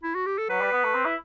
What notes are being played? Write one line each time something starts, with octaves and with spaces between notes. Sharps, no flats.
E4
F#4
G4
A4
F#3 B4
G3
B3
A3
C4
E4